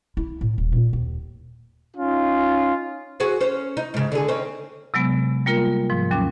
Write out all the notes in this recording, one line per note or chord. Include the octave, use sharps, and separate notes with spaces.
E4
A2
D#1
A#2
D#2
C#4 D#4 F4
F#4 G#4 C5
C#4 C5
D#4
G#2 C#3
D3 G#4
C4 C#4 D#4
C3 F#3 G#3 B3
G3 A#3 F4 A#4
G#2 F3
D#2 F#3 C#4 D6